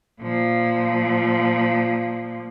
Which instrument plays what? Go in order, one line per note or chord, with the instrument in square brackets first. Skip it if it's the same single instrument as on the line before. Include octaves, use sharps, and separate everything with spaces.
[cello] A#2 F3